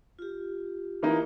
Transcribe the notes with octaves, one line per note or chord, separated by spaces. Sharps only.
F4 G4
E3 A#3 D#4